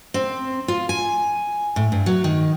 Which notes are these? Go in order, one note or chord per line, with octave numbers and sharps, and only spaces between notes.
C4
F4
G#5
A2
G2
F#3
D#3